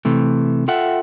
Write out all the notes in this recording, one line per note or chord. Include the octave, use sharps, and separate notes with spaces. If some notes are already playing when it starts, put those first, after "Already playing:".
C3 E3 A3
F4 A4 E5 F#5 G5